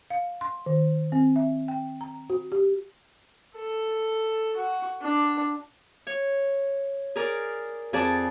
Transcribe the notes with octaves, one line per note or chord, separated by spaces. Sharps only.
F5
C6
D#3
C4
E5
G5
A#5
F#4
G4
A4
F#4
D4
C#5
G#4 A#4 D5
F2 G#4 D5 A5